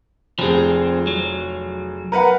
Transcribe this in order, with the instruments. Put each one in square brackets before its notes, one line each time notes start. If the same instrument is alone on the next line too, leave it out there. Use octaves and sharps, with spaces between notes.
[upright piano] F1 G#4 [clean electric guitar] F3 C4
[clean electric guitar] F#3
[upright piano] A#4 B4 F#5